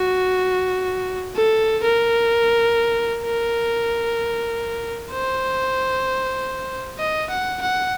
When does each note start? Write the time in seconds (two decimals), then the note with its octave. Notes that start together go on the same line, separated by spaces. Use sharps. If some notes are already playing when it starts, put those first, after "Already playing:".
Already playing: F#4
1.36 A4
1.84 A#4
3.24 A#4
5.11 C5
6.99 D#5
7.30 F#5
7.62 F#5